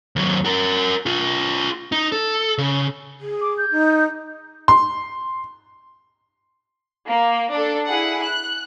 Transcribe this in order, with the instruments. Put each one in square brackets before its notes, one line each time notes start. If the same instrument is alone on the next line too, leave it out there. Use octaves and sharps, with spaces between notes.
[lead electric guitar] D#2 F#3
F#4 A#4
F4 G#4
D#4
A4
C#3
[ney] G#4
[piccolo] D6
G6
[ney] D#4
[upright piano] C6
[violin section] A#3
D4 A4
E4 G#4 F#5
F#6